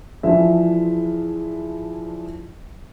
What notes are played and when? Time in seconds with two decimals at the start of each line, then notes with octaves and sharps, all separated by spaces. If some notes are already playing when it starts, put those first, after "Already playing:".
0.23 E3 F3 D4 E4 G#4 E5